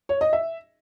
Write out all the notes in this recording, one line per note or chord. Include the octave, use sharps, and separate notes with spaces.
C#5
D#5
E5